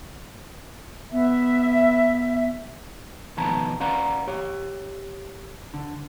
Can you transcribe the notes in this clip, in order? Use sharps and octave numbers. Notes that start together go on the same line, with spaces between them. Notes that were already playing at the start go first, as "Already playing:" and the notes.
B3 E5
B1 D#3 F3 B3 A5 A#5
C#4 B4 D5 F5 F#5 A#5
G4 C#5
D3